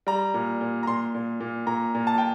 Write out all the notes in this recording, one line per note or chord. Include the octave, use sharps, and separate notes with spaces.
G3 A#5
A#2
A#2
A#5
A#2 C6
A#2
A#2
A#2 A#5
A#2
A5
G5